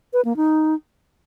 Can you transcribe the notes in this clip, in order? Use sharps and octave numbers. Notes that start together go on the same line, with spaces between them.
B4
A#3
D#4